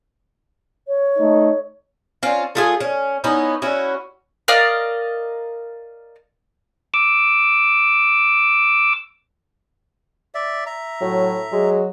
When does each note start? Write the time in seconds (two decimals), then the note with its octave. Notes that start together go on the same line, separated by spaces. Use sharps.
0.88 C#5
1.18 A3 D#4
2.23 C4 C#4 F4
2.55 A3 F4 G#4
2.80 C#4
3.24 B3 C#4 D#4 E4
3.62 C#4 E4 F#4
4.48 A#4 D5 D#5 F5
6.94 D6 E6
10.35 D5 E5
10.66 E5 A#5
11.01 A2 F#3
11.52 F#3 G#3